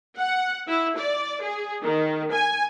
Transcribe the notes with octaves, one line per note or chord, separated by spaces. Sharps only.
F#5
E4
D5
G#4
D#3
G#5